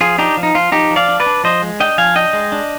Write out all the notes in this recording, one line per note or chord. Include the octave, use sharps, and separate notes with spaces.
F3 F4 G#4
D4 D#4 G4
F3
D#4
F3 F4
F3 D#4 G4
F3
D5 F5
D4
B4 D5
D4
F3 C5 D#5
G#3
D4 D#5 G5
F3 F5 G#5
D4 D#5 G5
G#3
D4